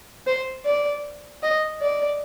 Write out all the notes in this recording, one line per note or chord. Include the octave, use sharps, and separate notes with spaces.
C5
D5
D#5
D5